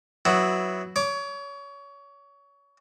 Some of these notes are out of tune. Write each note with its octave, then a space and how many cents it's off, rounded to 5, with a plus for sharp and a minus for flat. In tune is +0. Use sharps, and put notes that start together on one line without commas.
F#3 +0 B3 +0 E4 -15
C#5 +25 D6 +0